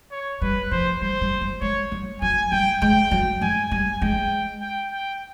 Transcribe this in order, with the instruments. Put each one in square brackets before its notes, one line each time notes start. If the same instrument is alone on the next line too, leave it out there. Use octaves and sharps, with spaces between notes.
[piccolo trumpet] C#5
[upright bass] G3 [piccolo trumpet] B4
[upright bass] F3 [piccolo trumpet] C5
[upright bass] G3 [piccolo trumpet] C5
[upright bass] G3
F#3
[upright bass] G#3 [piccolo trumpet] C#5
[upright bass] G3
[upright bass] F#3 [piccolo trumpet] G#5
[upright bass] G3 [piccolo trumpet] G5
[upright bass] G#3 [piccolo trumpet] G5
[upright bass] F#3
[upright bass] G#3 [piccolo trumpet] G#5
[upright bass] G3 [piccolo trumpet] G#5
[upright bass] G#3 [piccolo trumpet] G5
[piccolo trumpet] G5
G5